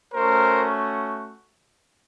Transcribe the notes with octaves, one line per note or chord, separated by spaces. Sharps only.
A3 C#4 F#4 A#4 C5